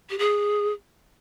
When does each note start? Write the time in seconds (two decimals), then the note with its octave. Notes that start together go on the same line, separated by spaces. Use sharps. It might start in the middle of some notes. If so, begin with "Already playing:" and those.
0.09 G4
0.18 G#4